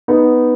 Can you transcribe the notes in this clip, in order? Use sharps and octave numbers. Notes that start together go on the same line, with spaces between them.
B3 D#4